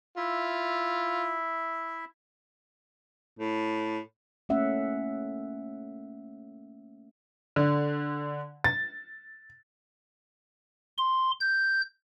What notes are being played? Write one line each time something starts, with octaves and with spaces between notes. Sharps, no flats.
E4 F4 E5
A2
A3 A#3 C#4 E5 F#5
D3
A6
C6
G6